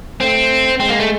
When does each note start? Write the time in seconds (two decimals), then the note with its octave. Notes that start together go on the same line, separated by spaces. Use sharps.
0.20 A3 C4
0.80 G#3 C4
0.89 A#3
1.00 A3